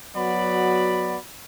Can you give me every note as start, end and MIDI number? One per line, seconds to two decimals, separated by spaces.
0.16 1.16 54
0.16 1.16 59
0.16 1.16 66
0.16 1.16 74
0.16 1.16 83